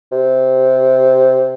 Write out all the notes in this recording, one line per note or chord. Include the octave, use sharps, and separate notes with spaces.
C3